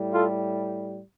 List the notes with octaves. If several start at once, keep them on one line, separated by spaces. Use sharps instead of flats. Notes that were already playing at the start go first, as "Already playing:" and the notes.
Already playing: A2 G3
F4 A4